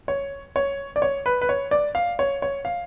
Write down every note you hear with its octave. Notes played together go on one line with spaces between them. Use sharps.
C#5
C#5
D5
C#5
B4
B4
C#5
D5
F5
C#5
C#5
F5